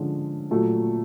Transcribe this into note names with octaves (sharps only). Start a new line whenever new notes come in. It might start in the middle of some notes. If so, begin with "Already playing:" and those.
Already playing: D3 F3 G#3 C#4
A#2 F#3 A3